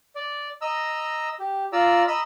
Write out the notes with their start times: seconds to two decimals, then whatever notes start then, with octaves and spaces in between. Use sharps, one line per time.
0.16 D5
0.61 D#5 A#5 E6
1.39 G4
1.73 F4 D5 A#5 E6
2.08 D#5 A#5 B5 E6